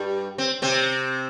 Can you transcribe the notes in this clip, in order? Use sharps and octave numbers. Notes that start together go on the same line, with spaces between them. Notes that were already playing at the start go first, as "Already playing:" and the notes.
Already playing: G2 G3
C4
C3 C4